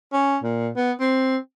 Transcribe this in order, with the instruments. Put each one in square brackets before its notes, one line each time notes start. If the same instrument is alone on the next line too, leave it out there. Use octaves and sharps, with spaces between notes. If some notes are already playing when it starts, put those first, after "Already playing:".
[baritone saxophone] C#4
A#2
B3
C4